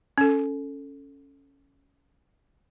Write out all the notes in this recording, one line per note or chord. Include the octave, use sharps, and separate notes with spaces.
C#4 A4